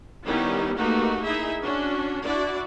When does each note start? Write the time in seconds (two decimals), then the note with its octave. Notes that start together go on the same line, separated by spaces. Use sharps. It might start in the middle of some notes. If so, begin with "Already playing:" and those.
0.25 D#3 G3 B3 C#4 D#4 E4
0.76 A3 A#3 D#4 F#4 G4 B4
1.22 D#4 E4 G#4 E5
1.62 C#4 D4 F#4
2.23 D4 E4 F#4 D5